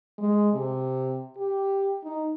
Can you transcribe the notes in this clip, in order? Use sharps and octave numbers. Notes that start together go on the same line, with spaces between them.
G#3
C3
G4
D#4